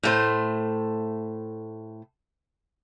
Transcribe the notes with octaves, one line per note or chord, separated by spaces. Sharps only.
A2 A3 C5